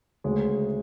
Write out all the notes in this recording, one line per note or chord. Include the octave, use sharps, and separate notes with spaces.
D2 C#3 G#3